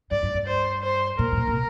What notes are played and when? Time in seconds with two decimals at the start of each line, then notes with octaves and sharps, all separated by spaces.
0.11 G2 D5
0.23 G2
0.34 G2
0.47 C5
0.82 C5
1.19 A#2 A#4
1.32 A2
1.37 A#2
1.47 C3